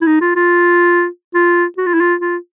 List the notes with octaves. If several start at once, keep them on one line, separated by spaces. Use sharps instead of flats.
E4
D#4
F4
F4
F4
F#4
F4
E4
F4
F4